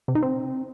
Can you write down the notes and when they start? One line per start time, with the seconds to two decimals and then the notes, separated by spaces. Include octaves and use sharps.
0.08 C3
0.15 D#4
0.22 C4